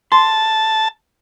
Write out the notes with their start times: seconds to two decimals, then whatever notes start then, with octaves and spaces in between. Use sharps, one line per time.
0.12 A5 C6